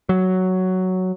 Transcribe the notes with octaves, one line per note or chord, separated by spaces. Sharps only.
F#3